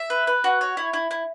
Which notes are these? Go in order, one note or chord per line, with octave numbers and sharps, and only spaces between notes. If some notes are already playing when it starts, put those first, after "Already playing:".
Already playing: E5
B4
B4
F#4
C#5
E4
E4
E4